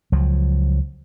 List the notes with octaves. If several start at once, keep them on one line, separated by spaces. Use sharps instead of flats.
C#2 F3 F#3